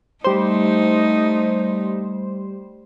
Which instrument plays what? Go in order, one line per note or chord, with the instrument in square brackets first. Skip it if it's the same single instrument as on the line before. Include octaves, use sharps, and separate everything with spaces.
[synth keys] G3 C5 [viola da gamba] A3 D#4